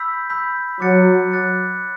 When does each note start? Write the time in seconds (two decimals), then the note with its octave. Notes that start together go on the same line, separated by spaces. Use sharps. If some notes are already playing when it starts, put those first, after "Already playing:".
Already playing: B5 E6 G6 B6
0.30 B5 E6 G6 B6
0.80 F#3 D6 F#6 A6 C#7
1.32 D6 F#6 A6 C#7